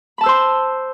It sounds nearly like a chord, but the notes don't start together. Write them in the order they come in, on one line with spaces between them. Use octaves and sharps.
B5 A5 E6 C5 C6